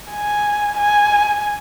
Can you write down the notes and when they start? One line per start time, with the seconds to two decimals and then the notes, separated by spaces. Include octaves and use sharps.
0.13 G#5
0.77 G#5